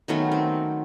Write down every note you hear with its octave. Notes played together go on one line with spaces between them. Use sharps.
D#3 F#3 A3 B3 C#4
C4